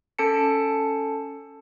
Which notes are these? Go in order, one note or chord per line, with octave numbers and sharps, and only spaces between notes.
C#4 A4 A5 C#7